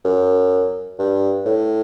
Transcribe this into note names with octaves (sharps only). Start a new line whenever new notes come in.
F#2
G2
A2